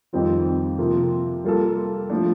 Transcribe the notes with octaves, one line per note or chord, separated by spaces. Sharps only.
F2 D#3 G3 C4 F4
C3 F3 A#3 F4
G3 A#3 F4 A4
F3 A3 D4